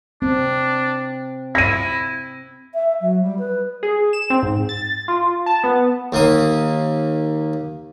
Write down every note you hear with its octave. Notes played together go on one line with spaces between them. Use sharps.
C4 D4
E4 A#6 D#7
E5
F#3
G3
B4
G#4
E7
C4
G#2
A6
F4
A5
B3
D#2 A#3 D#6